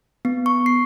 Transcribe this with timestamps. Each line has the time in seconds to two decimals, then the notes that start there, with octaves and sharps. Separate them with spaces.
0.25 B3
0.46 C#6
0.66 C7